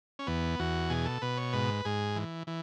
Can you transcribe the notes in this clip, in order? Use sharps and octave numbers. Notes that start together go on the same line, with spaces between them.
C#4
E2 B3
E2 F#4
B2 G#4
A4
B2 B4
C#5
G#2 B4
G#2 G#4
E3
E3